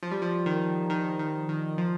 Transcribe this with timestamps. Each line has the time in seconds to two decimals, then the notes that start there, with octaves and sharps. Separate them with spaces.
0.03 F3
0.11 G3
0.22 F3
0.46 D#3
0.90 D#3
1.19 D#3
1.49 D#3
1.78 F3